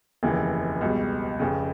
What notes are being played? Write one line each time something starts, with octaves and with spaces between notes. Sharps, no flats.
F1 D#2 C#3 E3
C#2 B2 G3
F1 F2 C#3